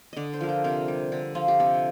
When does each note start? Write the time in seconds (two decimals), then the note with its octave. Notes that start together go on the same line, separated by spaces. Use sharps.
0.13 D3 D5 D#5
0.33 C5
0.41 F3 A#4
0.49 C5
0.64 C3 A#4
0.88 G3
1.12 D3
1.35 F3 F4
1.48 G4
1.60 C3 A4